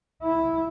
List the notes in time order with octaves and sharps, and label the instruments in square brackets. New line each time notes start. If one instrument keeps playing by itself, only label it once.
[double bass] E4